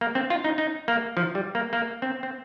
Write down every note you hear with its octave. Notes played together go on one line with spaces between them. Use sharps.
A#3
C4
F4
D#4
D#4
A#3
F3
G3
A#3
A#3
C4
C4